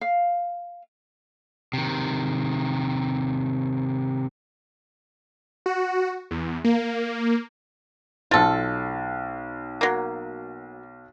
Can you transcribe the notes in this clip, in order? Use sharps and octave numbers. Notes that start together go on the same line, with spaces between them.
F5
C3 D#3
F#4
E2
A#3
B1 F4 A4 A6
F#3 A#3